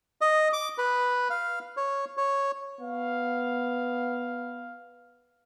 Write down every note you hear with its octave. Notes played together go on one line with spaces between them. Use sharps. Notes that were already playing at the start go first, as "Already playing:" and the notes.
D#5
D6
B4
F5
C#5
C#5
B3 F5